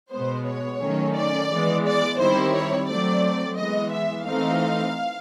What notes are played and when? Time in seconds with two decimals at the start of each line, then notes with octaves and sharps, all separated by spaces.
0.12 B2 G#3 B3 C5
0.47 C#5
0.81 D#3 F#3 A3 C#4
1.15 D5
1.50 E3 G#3 B3
1.85 D5
2.19 D#3 G3 C4 E4 C5
2.54 C#5
2.88 F#3 A3 C4 D5
3.58 E3 G#3 B3 D#5
3.92 E5
4.26 E3 A3 C4 D#4 F5